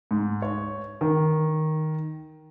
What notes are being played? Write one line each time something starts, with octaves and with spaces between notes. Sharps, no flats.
G#2
C#5
D#3